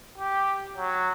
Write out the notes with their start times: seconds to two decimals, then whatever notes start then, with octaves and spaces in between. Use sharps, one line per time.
0.18 G4
0.77 F#3